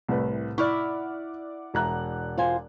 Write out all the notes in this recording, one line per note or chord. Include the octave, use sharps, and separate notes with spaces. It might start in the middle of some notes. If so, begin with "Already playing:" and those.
C2 A2 C3 B4
E4 D5 F#5 C#6 F6
E1 A#5 F#6
F4 C5 G#5